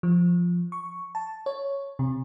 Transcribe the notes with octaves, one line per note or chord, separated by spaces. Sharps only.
F3
C#6
A5
C#5
C3